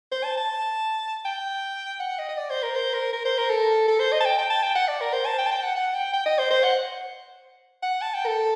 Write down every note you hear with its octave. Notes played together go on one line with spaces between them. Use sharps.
C5
A5
A5
G5
F#5
D#5
D#5
D5
C5
A#4
C5
A#4
A#4
C5
A#4
A4
A4
C5
D#5
A5
G5
G5
A5
G5
F#5
D5
A#4
C5
A5
G5
A5
G5
F#5
F#5
G5
G5
D#5
C5
C5
F#5
F#5
A5
G5
A4